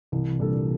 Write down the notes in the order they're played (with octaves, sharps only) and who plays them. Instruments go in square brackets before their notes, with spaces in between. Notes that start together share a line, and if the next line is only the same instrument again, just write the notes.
[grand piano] C2 [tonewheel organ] C3 E3
[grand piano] A#2 G3 D4 A4